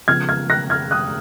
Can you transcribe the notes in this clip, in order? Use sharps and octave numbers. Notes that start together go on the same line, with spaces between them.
C#3 F3 G#3 B3 F6 G#6
F6 G#6
F#6 A#6
F6 G#6
D#6 F#6